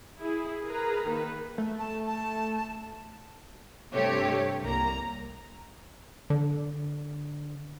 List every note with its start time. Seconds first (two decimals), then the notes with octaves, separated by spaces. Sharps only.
0.18 E4 G#4
0.65 G#4 A#4 B4 A#5
1.07 D#3 A#3 B4
1.58 A3
1.79 A5
2.07 A5
3.93 G2 C3 A3 G4 C#5
4.61 C2 A#3 A#5
6.30 D3